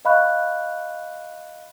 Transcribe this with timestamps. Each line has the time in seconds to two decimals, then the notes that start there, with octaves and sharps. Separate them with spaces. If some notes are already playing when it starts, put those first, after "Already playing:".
0.05 D#5 F5 B5 C#6 F#6